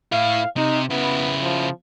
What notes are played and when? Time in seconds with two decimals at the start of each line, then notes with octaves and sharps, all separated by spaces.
0.12 A2 E4 F5
0.57 C3 D#4
0.90 C#3 B3 E4
1.42 F3